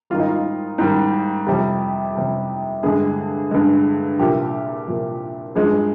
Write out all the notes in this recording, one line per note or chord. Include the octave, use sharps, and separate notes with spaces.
G#2 D#3 G3 F4
D#4
F4
G#2 D#3 G3
F2 C3 G3 G4
F2 C3 G3
G2 D3 G#3 G#4
G2 D3 G#3
C2 A#2 F3 G4
C2 A#2 F3
G2 F3 G#3 G#4